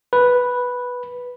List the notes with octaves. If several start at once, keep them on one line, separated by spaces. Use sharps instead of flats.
B4